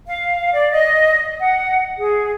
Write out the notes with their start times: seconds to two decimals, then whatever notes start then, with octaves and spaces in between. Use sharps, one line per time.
0.07 F5
0.53 D5
0.71 D#5
1.40 F#5
1.98 G#4